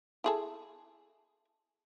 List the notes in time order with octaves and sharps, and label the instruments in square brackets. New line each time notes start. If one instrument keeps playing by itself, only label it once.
[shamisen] E4 G#4 A4